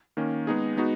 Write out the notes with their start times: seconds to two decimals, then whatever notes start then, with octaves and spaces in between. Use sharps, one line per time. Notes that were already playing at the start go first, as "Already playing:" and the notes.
0.17 D#3 A#3 C#4
0.47 G#3 B3 D#4 G#4
0.77 G#3 B3 D#4 F#4